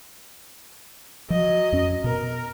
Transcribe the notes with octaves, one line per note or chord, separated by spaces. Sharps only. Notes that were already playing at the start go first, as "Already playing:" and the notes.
F3 F#3 D#5
F2 C#4
B2 A#4